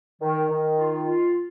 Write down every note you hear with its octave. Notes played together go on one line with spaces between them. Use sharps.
D#3
D#3
F4
F4